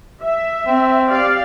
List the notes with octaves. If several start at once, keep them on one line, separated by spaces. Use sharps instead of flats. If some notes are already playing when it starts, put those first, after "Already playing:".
E5
C4
G4 D5 F5